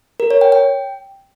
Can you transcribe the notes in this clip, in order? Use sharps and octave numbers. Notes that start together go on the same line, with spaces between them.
A#4
C#5
G5
G5